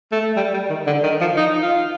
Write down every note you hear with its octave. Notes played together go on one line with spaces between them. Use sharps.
A3
G3
G3
D#3
D3
D#3
F3
D#4
F4